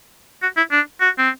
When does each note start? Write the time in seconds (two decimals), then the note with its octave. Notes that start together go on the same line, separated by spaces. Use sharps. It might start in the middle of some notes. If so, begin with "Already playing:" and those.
0.42 F#4
0.57 E4
0.71 D4
1.00 F#4
1.19 C4